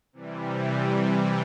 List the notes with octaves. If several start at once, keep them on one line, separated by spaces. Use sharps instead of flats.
C3 E3 G3